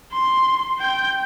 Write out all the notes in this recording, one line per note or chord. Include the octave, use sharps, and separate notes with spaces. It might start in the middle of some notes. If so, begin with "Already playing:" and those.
C6
G5 G6